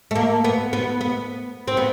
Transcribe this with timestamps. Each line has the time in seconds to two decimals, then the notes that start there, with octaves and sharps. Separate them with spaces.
0.11 A3
0.15 A#3
0.44 B3
0.73 B3
1.01 B3
1.68 C4
1.77 B3